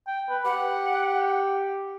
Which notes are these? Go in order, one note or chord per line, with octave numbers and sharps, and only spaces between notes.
G5
B4
G4 F#5